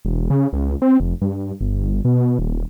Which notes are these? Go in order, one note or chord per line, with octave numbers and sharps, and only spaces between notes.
E1
C#3
C#2
C4
F1
G2
G1
B2
D#1